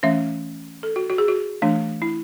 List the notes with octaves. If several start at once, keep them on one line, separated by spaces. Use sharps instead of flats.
E3 A3 C#4 E5
A4
F#4
F#4
G#4
F#4
E3 A3 D4
E4